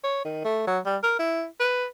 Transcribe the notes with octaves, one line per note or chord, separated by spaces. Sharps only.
C#5
D#3
A3
F#3
G3
A#4
E4
B4